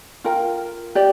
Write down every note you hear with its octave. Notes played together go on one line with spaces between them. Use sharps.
F4 A#4 G5
G4 D5